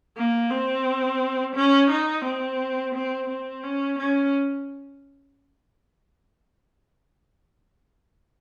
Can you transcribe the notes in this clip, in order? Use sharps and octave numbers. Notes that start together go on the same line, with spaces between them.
A#3
C4
C#4
D#4
C4
C4
C4
C#4
C#4